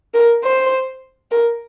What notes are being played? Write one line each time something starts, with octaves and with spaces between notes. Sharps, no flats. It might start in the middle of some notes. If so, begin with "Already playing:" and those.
A#4
C5
A#4